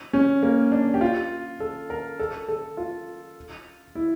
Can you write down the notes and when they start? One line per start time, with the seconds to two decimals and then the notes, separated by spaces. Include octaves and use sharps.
0.13 C#4
0.43 A#3
0.72 D4
0.94 G4
1.01 F4
1.60 A4
1.90 A#4
2.19 A4
2.49 A4
2.77 F4
3.95 E4